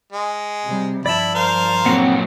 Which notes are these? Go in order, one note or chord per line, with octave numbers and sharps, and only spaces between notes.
G#3
C3 G3
G2 F3 E4 D5 A5 B5
A#4 C5 F5
A#2 F#3 C4 F#5